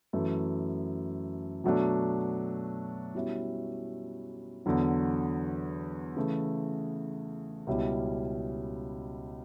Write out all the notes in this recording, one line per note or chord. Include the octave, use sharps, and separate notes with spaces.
F#2 E3 A3
B2 F#3 A3 D4
B2 G3 C#4 E4
E2 D3 F#3
C#3 E3 A3
C#2 B2 G3 C#4 E4